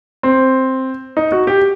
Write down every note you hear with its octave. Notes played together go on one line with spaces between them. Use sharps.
C4
D#4
F#4
G4